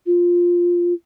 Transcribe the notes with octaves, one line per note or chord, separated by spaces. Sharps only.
F4